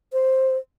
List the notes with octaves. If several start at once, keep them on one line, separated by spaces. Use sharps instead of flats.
C5